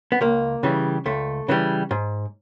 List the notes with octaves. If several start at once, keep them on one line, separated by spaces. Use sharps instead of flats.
B3
C#2 A#3
C#3 E3 G3
C#2 A3
C#3 E3 G3
G#2